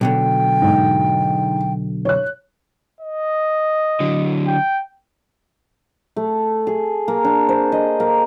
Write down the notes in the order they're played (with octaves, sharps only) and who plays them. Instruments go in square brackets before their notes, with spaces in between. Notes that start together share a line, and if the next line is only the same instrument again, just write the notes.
[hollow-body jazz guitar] B1 B2 D3 [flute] G5
[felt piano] G#2
C#5 F#6
[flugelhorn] D#5
[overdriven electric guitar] D3 F#3
[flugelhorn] G5
[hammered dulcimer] A3
G#4
A#3
D4
C5
D#5
A#3